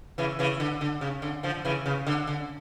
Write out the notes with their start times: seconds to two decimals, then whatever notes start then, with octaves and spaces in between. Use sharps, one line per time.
0.18 C#3 E3
0.39 C#3 E3
0.60 D3
0.81 D3
1.01 C#3
1.22 D3
1.43 D3 F3
1.65 C#3 E3
1.86 C#3
2.07 D3
2.27 D3